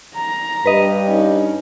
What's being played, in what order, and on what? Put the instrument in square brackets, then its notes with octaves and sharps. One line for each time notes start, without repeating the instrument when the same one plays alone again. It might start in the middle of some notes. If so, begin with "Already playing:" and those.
[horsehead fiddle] A#5
[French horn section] G2 [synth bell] B4 D#5
[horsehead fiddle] C#4 D#4